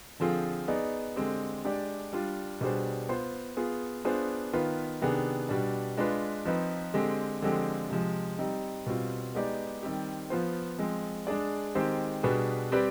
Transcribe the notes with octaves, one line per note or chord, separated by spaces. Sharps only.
D3 F3 C4 F4 G#4
B3 D#4 G#4 D5
D3 G#3 C4 G4
G#3 D4 G4 D5
G3 D4 F4
B2 G3 D4 G#4 C5
B3 F4 C5
B3 F4 G#4
B3 D4 F4 G#4 C5
D#3 B3 F4 B4
C3 D#3 B3 D4 G#4
B2 G3 D4
G#3 D4 F4 B4
F3 C4 D#4 B4
D3 G#3 C4 G4
D3 F3 G#3 C4 G4
C3 F3 G#3
G3 C4 D#4
B2 G3 C4 F4
G#3 B3 D#4 G4 D5
D#3 G3 C4 G4
F3 B3 F4 C5
F3 G#3 C4
G#3 D4 G#4 D5
D#3 G#3 C4 G4 C5
B2 G3 D4 G#4 B4
G3 C4 G4 B4 D5